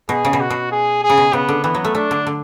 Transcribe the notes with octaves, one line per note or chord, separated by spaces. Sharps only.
B2 G#4
C#3
B2
F#4
B2
G#4
G#4
C#3
B2
C#3 B3
D3
E3 B3
F#3
A3
A3 D4
D3
D3